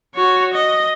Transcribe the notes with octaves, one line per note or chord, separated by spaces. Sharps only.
F#4 C#5
D#5